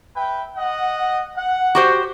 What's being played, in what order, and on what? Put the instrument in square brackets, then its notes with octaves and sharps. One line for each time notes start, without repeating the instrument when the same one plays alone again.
[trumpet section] B4 E5 G5
D#5 F#5
F#5
[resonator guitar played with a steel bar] F#4 G4 C5